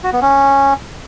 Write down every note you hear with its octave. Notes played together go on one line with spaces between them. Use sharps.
F#4
B3
C#4